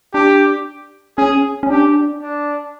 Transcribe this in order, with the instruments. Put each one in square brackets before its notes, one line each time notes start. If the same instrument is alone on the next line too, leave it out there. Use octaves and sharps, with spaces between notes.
[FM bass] D4 [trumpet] G4
[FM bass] C#4 [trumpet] G#4
[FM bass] C#4
[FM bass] D4 [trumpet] G4
[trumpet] D4